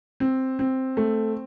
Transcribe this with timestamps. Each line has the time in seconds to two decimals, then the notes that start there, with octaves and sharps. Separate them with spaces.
0.20 C4
0.59 C4
0.97 A3